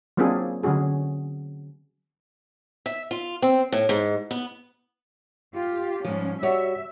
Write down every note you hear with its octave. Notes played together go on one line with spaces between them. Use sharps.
F#3 A#3 C4 D4 F4 G#4
D3 F#3 C#4 F#4 G#4
E5
F4
C4
A2
G#2
B3
F4 G4
G#2 F3 G3 C#4
G3 F#4 C#5 E5